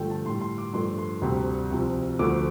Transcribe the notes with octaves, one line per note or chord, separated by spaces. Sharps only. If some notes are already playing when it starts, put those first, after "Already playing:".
Already playing: G2 D3 F3 A3 G5
A5
A2 G3 C6
C6
D6
G2 F3 A3 C6
C6
D2 C3 G3
C2 C3 F3
D2 D3 F3 A3 D6